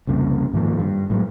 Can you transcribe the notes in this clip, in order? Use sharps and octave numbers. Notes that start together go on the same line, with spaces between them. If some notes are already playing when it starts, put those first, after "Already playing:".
C2 F2 C#3 A#3
G#2 D#3 F3 A#3
G2
A2 F#3 G#3